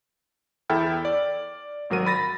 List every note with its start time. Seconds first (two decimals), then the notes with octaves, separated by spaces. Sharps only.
0.70 E2 E4 A4 G5 F6
1.05 D5
1.90 G#1 F#3 A#4 D#7
2.06 B5 A6 A#6